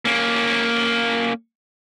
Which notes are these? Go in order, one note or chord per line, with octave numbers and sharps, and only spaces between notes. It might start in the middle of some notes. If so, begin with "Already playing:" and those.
A#3 C#4